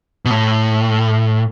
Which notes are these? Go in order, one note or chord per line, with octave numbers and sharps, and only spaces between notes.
B2
A2